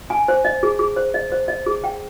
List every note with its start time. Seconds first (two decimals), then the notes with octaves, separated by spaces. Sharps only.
0.10 G#5
0.28 C5
0.45 D#5
0.63 G#4
0.79 G#4
0.96 C5
1.14 D#5
1.32 C5
1.48 D#5
1.66 G#4
1.84 G5